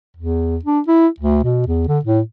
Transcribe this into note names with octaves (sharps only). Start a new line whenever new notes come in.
E2
D4
E4
D2
B2
E2
D3
A2